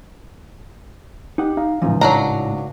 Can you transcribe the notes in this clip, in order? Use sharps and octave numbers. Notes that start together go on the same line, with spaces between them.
D#4 G4 F#5
D#4 F5
C#2 G#2 C#3 E3 F3 D#4
A2 F#3 D4 A#5